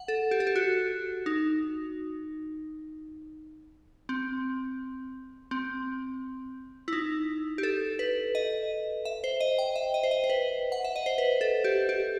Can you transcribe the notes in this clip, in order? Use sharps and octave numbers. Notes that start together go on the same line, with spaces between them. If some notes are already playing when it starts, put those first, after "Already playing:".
Already playing: F#5
A4
G4
A4
G4
F#4
D#4
C4
C4
E4
D#4
G4
A4
B4
D#5
E5
C5
D#5
G5
E5
D#5
C5
D#5
C5
B4
F#5
E5
D#5
C5
B4
A4
G4
G4